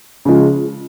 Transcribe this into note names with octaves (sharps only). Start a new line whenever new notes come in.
C#3 F3 G#3